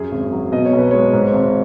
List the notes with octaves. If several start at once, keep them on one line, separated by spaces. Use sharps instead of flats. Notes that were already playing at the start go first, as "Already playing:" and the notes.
Already playing: F#2 G#4
G#1
F#3
B2 D#5
C#5
B1 B4
G#3 C#5
G#2
G#1